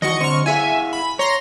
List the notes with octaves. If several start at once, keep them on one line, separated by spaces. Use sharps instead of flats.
D#3 E3 F#4 D#5 C#6 C#7
D3 C4 C5 C#6 F6
E4 G#4 E5 F5 G#5
B5
C#5 A#5 C6 A#6